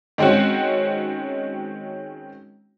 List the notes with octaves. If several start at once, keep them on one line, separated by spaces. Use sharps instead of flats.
D#3 G#3 C4 C#4 F#4